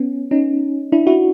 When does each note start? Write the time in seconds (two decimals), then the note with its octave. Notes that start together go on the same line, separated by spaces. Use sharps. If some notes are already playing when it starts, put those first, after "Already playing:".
Already playing: B3 C#4
0.31 C#4 D#4
0.92 D4 E4
1.07 E4 F#4